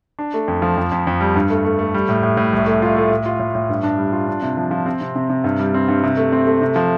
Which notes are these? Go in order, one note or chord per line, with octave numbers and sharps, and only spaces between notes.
D4
A3
F2
F3
F2
F2
F2
G3
G2
A3
A3
A3
G3
A2
A2
A2
C2
A3
F4
A3
A2
F4
A2
A2
G2
D4
G3
F4
D4
C3
F3
F3
C4
C3
C3
C3
G2
G3
C4
G2
C3
A3
C4
A3
C3
F3